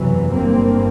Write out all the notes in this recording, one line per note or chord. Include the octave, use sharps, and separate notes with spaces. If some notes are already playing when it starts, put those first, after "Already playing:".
Already playing: F#1 E2 C3 E3 F#3
G1 G2 A#3 C4